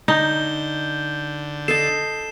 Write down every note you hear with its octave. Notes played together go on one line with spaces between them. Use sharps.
D3 D#4 G6 G7
A4 D#5 A5 C7 E7